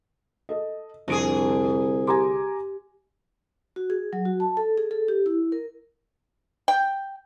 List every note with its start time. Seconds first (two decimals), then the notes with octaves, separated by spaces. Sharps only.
0.49 A4 D#5
1.08 C2 F2 D3 G#4 D7
2.07 G4 G#5 A#5 C6 D6
3.76 F#4
3.90 G#4
4.13 F#3
4.25 F#4
4.40 A5
4.57 A4
4.78 G#4
4.91 A4
5.08 G4
5.26 E4
5.52 A#4
6.68 G5